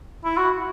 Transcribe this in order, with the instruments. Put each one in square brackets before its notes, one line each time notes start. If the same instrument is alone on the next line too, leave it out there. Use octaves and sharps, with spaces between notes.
[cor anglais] E4
F#4